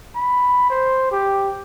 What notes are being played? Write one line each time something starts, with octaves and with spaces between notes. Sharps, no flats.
B5
C5
G4